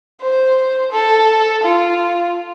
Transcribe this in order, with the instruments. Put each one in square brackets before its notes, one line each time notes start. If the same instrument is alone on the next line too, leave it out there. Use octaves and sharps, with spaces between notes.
[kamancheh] C5
A4
F4